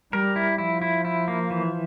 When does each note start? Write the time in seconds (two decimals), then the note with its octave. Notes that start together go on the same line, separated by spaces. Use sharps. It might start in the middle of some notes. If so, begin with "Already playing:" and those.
0.12 G3 A#4
0.36 E4
0.58 F3 E4
0.82 E4
1.05 E4
1.28 A#3
1.50 E3